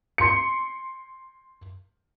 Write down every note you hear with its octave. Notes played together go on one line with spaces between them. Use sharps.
C6 C#7